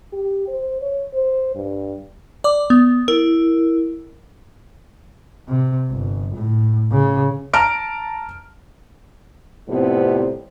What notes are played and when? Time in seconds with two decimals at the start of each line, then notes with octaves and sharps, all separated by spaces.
0.13 G4
0.48 C5
0.82 C#5
1.13 C5
1.55 G2
2.44 D5 D6
2.70 B3
3.08 E4 A#4
5.49 C3
5.90 G1
6.36 A2
6.92 C#3
7.54 A5 A#5 F6 D7
9.68 F2 A2 C3 G3 B3 C4